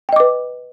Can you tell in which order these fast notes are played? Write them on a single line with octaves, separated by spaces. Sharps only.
G5 D#5 D6 B4